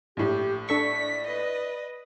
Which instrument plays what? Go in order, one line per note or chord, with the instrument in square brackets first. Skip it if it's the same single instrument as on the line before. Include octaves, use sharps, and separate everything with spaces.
[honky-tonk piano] A#1 A2 [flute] G4
[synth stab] D4 A4 C#6 [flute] D5 [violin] B6
[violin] B4 D#5